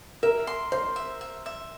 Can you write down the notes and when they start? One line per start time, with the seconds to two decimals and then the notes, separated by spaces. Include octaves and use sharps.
0.23 A#4 E5
0.47 C6
0.72 C5 C6
0.96 E5
1.21 E5
1.46 E5